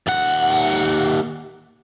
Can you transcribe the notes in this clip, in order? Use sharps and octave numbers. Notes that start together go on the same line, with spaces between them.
D#2 F#5